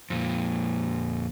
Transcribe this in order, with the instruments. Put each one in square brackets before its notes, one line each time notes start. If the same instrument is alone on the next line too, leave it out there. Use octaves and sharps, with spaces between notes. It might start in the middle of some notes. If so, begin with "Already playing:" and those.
[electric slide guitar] F2 A#2